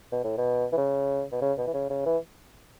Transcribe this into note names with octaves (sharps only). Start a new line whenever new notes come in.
B2
A2
B2
E3
C#3
B2
C#3
B2
E3
C#3
C#3
E3